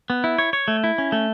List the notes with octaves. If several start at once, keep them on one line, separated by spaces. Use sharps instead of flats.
B3
E4
C#5
C#5
A3
E4
C#4
A3